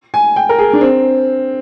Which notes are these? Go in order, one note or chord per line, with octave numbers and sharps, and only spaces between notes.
G#5
G5
A#4
G#4
D4
C4